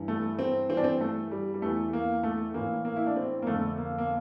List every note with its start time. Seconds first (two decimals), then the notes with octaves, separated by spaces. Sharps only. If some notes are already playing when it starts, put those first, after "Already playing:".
Already playing: G2 E3
0.08 A3
0.39 C4
0.69 G2 E3 C4
0.77 D4
0.84 C4
1.01 A3
1.31 G3
1.54 G3
1.62 E2 E3 A3
1.93 A#3
2.23 A3
2.54 A2 E3 A#3
2.85 A#3
2.96 E4
3.06 D4
3.16 C4
3.42 A#3
3.47 F2 D3 A3
3.78 A#3
3.98 A#3